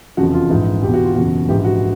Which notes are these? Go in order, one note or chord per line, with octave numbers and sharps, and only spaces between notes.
F1 E2 C#3 F3 F#4
F4
A#1 G#2 E3
E2 B2 G4
F#4
F4
F#1 E2 B2 F#4
A#1 G#2 E3 G4
F#4